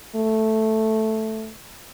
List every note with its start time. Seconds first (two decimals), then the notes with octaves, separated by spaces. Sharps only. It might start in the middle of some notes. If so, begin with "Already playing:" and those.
0.16 A3